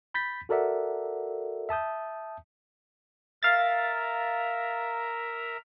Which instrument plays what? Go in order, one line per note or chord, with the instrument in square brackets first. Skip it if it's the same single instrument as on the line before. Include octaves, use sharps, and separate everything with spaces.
[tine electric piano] B5 G6 A6 B6
F#4 A4 A#4 D5 E5 F#5
E5 A5 D#6 G6
[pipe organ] A#4 E5 A#5 [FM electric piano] F5 A6